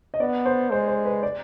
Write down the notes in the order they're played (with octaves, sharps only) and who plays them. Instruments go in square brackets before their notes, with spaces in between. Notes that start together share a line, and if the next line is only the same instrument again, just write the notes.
[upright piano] D#5
[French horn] B3 [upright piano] D5
[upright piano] C5
[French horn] G#3 [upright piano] C5
[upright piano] C5
B4
D5